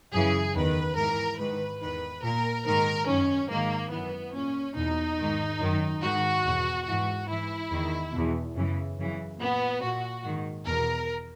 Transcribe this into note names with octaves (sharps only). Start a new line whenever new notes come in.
F#2 C#3 E3 G#4
E2 D#3 B4
G#2 E3 A#4
G#2 D#3 B4
E2 D#3 B4
A#2 A#4
G#2 D#3 A#4
F#2 D#3 C#4
G#2 D#3 A#3
F#2 E3 B3
A#2 C#4
E2 B2 D#4
G#2 D#3
F#2 D#3
G#2 D#3 F#4
E2 B2
G#2 E3 F#4
G#2 E3 E4
E2 D#3
E2 B2
F#2 C#3 E3
F#2 C#3 E3
A#2 B3
A#2 F#4
G#2 D#3
E2 B2 A#4